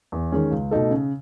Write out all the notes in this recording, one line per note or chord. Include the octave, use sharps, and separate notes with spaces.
E2
D#3 G#3 C#4 G#4
C#2
B2 A3 D#4 A4
C#3